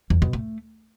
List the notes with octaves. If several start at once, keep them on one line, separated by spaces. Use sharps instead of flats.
E2
B2
A3